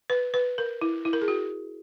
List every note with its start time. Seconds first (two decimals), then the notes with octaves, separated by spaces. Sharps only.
0.10 B4
0.34 B4
0.58 A#4
0.81 E4
1.05 E4
1.13 A#4
1.21 G#4
1.28 F#4